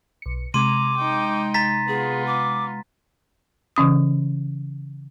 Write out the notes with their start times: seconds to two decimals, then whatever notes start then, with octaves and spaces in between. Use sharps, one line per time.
0.22 B1 C#7
0.54 C3 G#3 A#5 C6 D6 D#7
0.97 D#4 G5
1.54 A#5 A6 B6
1.88 B3 F4 G#4
2.26 D6
3.76 C#3 E3 C#4 D#6